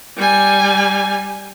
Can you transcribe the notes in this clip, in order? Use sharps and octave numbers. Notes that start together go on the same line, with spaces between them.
G3 G#5